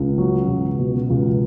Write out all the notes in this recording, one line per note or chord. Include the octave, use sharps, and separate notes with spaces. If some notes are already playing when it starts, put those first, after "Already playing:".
Already playing: C#2
F#3
C#2
B2
C#2